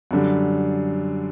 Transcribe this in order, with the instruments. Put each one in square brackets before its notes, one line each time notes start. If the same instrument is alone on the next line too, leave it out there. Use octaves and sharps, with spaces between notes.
[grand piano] F#2 D3 G3